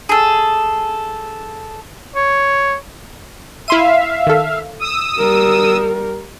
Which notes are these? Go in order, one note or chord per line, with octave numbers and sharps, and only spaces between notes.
G#4 A4
C#5
E4 E5 F5 C6 D#7
D#3 A4
D#6 E6
G3 A#4